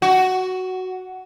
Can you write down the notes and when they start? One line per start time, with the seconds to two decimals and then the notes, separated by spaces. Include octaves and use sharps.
0.02 F#4